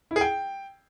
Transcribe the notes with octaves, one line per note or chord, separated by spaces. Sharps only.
E4
G#4
G5